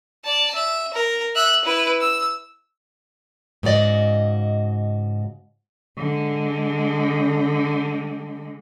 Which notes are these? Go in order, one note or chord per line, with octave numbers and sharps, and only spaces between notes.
D5 A5
E5
A#4
E5 F#6
E4 B4
E6
G#2 C#3 F#4 D5 D#5
D3 G#3